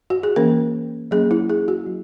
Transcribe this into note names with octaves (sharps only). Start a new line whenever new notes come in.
F#4
G#4
E3 A#3 C#4 A#4
F#3 A#3 C#4 G#4
E4
G#4
F#4
F#3